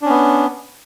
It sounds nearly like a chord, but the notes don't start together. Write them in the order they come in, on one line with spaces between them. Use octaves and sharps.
D4 C#4 B3